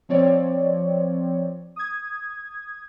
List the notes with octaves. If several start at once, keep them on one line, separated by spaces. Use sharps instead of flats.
F3 C4 C#5 D5
D#6 G#6